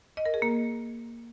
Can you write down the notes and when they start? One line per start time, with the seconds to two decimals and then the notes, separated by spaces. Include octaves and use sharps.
0.17 D#5
0.26 A#4
0.34 G#4
0.42 A#3